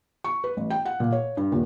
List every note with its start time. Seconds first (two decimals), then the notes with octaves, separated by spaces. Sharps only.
0.24 C#6
0.44 B4
0.57 A1
0.70 G5
0.85 F#5
1.00 A#2
1.12 C#5
1.37 G2
1.52 D#1